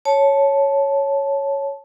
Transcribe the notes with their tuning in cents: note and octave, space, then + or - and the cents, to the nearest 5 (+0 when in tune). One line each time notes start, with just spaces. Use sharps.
C#5 +0 A5 -10